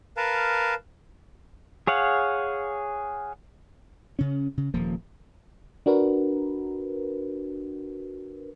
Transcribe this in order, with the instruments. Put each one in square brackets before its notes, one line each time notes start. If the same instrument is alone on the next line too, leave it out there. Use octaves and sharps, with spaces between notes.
[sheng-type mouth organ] A#4 B4 F5 A5
[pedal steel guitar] G#4 C#5 F5 F#5
[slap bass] C#3 C#4
C#3
D#1 F3 A#3
[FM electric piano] D4 F#4 A#4 B4